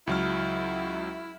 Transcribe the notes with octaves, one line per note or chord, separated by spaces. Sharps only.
C#2 F#3 E4 F6